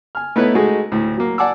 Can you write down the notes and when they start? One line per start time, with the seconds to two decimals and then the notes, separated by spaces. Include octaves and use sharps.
0.15 G#5 F6
0.36 A3 B3 D#4 E4 B4 C#5
0.55 G#3 A3 D#4 F#4 G#4
0.92 D2 A2
1.18 F#3 A#3
1.38 D5 F#5 G#5 A5 D6 E6